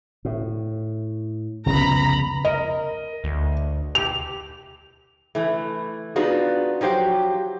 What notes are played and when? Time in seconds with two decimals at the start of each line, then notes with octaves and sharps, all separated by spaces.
0.25 A2
1.66 C2 F2 C#3 B3 A#5 B5
2.45 A#4 D#5
3.24 D2
3.95 G4 F7
5.35 E3 A3
6.16 B3 D4 D#4 F4 F#4 G#4
6.81 F3 F#3 G4 C5 F#5